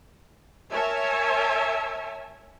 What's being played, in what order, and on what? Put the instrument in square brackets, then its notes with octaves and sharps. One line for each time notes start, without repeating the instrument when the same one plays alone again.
[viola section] A#4 C#5 E5 G#5 A5